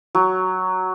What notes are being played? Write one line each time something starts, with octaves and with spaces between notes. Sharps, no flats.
F#3